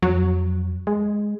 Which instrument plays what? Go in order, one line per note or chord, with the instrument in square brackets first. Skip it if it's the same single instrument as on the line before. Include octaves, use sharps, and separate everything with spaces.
[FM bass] F2 [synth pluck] F#3
[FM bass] G#3